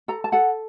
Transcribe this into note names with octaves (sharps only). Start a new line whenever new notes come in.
A4 A#5
A5
A4 F#5